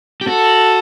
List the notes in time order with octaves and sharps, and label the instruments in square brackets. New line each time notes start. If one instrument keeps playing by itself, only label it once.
[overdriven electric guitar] G4
[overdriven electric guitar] F#4 [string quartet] A4